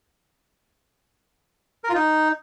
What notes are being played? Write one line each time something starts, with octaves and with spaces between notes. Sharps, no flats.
A#4
F4
D#4